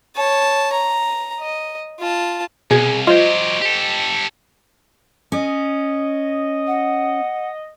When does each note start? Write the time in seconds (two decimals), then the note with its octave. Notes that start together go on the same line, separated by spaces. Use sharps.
0.16 C#5 A5
0.73 A#5
1.40 D#5
2.00 F4 A5
2.71 C2 B2 G#4
3.07 F#3 F4 G4 C5 D#5
3.62 G4 A4
5.32 C#4 D#5
6.67 F#5